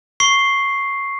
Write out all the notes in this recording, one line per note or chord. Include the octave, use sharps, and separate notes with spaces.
C#6 C7